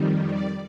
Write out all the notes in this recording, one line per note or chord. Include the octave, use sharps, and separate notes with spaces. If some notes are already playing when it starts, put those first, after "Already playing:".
Already playing: F2 D#3 G3
D5